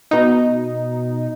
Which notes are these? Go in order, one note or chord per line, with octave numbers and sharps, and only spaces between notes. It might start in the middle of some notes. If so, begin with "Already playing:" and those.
B2 D#4